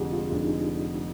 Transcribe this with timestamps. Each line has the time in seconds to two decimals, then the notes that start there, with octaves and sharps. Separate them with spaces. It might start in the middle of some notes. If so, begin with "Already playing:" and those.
Already playing: F1 F2 D3 F4 G4 G#4
0.12 G#3 F4
0.31 F1 D4
0.41 D#4